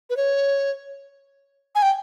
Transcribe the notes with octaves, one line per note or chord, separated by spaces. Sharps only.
B4
C#5
G#5
G5